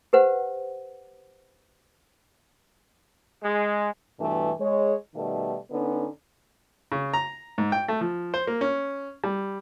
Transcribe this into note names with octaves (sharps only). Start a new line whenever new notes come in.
G4 B4 C5 F#5
G#3
G2 B2 E3 A3
G#3 C#5
B2 D#3 G3 A3
D3 B3 C#4 D#4
C#3
A#5
G#2
G5
A3
F3
C5
A#3
C#4
G3